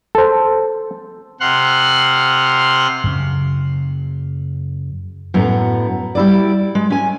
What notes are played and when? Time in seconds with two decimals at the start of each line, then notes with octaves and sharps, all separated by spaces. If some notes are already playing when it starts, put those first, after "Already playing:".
0.15 A4 C5
1.40 C3 F#5 C6 F6 F#6
3.04 F#2 C#3 C#4
5.34 F#2 A2 B3 A#5
6.15 G3 E4 D5
6.75 G#3
6.90 C#4 G#5